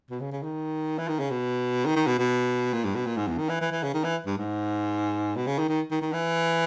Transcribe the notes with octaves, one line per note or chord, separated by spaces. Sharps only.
B2
C#3
C#3
D#3
E3
D#3
C#3
B2
D#3
D#3
B2
B2
A#2
G2
B2
A#2
G#2
E2
D#3
E3
E3
E3
C#3
D#3
E3
G2
G#2
B2
C#3
D#3
D#3
D#3
D#3
E3